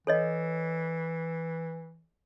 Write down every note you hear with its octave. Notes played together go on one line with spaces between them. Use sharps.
E3 A4 C#5 D#5